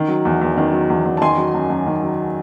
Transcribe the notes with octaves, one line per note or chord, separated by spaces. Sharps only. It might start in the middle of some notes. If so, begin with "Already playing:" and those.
Already playing: D#3
F#3
E2
E2
D#3
F#3
E2
E2
A5
D#3 G#5 C6
F#3
F#2
F#2
D#3
F#3